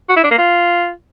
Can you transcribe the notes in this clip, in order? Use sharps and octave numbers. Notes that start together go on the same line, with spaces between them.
F#4
E4
D4
A#3
F4